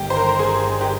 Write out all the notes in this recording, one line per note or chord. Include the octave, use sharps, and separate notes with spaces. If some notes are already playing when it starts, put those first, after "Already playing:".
Already playing: G1 G2 D#3 G4
C5
A#4
G#4
G4